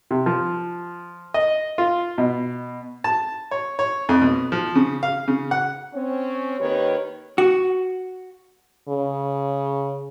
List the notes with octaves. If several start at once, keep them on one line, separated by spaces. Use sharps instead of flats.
C3
F3
D#5
F4
B2
A5
C#5
C#5
F2
B2
F3
C#3
F5
C#3
F#5
C4 C#4 C#5
D#2 D#3 G4 B4 C#5
F#4
C#3